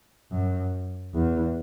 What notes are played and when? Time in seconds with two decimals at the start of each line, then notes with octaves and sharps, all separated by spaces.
0.31 F#2
1.14 E2